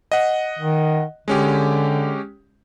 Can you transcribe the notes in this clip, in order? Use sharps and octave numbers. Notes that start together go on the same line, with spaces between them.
D#5 F#5
D#3
D3 G#3 C#4 G4